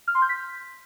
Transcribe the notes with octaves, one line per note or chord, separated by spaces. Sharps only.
F6
C6
G6
B6